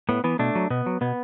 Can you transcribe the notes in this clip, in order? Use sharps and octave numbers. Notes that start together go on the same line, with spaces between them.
A2 B3
E3 B3
B2 A3 D4
F#3
B2 B3
F#3
B2 B3